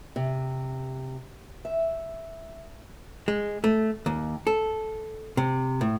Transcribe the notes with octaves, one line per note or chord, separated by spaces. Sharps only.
C3
E5
G#3
A3
D#2
A4
C3
A2